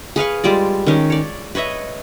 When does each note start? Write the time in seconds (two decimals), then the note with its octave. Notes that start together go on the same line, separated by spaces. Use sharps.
0.16 G#4 B4 F5 C#6
0.44 G3 G#3 F4 D5
0.87 D#3 C#4 D#4
1.10 C#5 D5
1.55 B4 C#5 D#5 E5